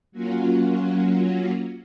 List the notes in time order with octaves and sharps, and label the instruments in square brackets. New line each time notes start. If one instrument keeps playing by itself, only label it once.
[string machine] F#3 A#3 C#4 F4 F#4